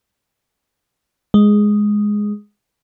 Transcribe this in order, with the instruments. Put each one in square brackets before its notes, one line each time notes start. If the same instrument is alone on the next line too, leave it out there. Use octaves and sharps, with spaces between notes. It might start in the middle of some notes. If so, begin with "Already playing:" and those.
[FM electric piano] G#3